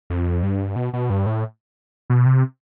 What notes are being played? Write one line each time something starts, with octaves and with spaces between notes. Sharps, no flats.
F2
G2
B2
B2
G2
A2
B2
C3